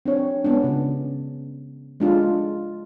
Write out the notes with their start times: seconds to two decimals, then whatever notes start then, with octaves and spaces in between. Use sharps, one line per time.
0.06 C4 D4 C#5
0.45 G#3 B3 C#4 D4
0.64 C#3
2.00 G#3 D4 F4